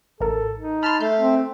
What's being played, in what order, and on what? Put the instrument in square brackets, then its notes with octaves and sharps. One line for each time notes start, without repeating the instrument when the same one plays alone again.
[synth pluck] A1 A#4 [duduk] A4
[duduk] D#4
[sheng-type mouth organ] A5 F6 [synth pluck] B5 C6
[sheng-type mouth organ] A3 [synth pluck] G6 C7
[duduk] C4